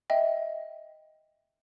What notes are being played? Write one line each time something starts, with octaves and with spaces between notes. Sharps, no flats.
D#5 E5 G5